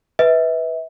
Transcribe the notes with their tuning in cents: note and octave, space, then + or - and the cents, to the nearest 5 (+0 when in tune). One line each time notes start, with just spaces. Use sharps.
B4 +0 E5 -30